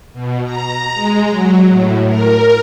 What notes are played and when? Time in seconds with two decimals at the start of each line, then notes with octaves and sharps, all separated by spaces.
0.13 B2
0.44 A#5
0.94 G#3
1.30 F#3
1.68 A2
2.07 A#4